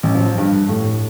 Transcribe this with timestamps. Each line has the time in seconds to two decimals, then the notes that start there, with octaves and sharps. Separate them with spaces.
0.03 A1
0.15 F3
0.38 G2
0.69 A2